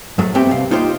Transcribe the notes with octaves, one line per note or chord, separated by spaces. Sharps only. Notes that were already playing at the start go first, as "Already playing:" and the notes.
G#2 F#3 A3
A3 B3 C4 G4 E5 G5
C2 F5
A#3 D#4 F4 G4 C5